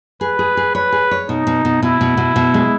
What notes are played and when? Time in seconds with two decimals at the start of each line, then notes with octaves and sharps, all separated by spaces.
0.21 G#4 B4
0.39 G#4
0.57 G#4
0.75 B4 C#5
0.92 G#4
1.11 C#5
1.29 B2 D#4
1.47 B2
1.65 B2
1.82 B2 E4
2.01 B2
2.17 B2
2.36 B2
2.54 G#3